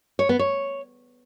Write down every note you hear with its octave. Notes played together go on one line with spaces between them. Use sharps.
C#5
B3
C#5